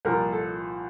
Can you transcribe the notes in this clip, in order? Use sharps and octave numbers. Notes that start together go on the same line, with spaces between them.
C2 A#2 F3 A#4
A4